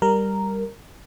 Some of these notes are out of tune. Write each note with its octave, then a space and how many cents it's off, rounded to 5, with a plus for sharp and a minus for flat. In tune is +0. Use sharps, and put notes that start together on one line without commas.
G3 +0 A#4 -5